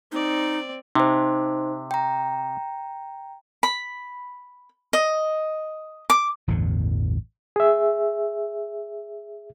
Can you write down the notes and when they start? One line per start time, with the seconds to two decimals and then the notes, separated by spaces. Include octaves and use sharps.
0.12 C4 D#4 D5
0.95 C3 D#4 C5
1.91 G5 A#5
3.63 B5
4.93 D#5
6.10 D6
6.48 A1 E2 G2 D3
7.56 G#4 E5